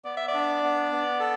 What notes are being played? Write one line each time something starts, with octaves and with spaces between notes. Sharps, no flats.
B3 D5
E5
D5
D4
B3
B3
A4